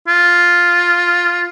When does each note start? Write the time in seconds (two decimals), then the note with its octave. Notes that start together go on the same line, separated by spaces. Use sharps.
0.07 F4